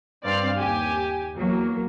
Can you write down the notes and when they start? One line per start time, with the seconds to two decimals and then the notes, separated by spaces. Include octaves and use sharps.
0.24 G2 C4 D5 F5 F6 C7
0.58 D#2 G4 G#5
1.35 E2 F#3 A#3